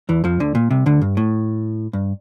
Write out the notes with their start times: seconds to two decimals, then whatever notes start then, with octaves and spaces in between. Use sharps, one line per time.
0.09 E2 E3
0.24 F2 F3
0.40 D2 D3
0.55 A#2
0.70 C2 C3
0.86 D2 D3
1.02 G2
1.17 A2
1.93 G2